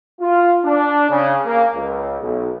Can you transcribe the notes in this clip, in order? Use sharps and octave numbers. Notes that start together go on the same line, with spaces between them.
F4
D4
C#3
A#3
C#2
B1